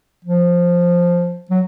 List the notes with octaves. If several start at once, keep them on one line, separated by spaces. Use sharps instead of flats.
F3
F#3